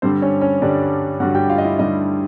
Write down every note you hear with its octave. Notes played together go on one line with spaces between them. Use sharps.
G2 D3 G3 C4 C5
C#4 C#5
C#4 C#5
G2 D3 G3 D4 D5
G2 D3 G3 F#4 F#5
G4 G5
F4 F5
D#5
E4 E5
G2 D3 G3 D#4 D#5